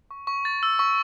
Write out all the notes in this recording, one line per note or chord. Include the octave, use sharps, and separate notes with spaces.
C#6
C#6
A6
E6
C#6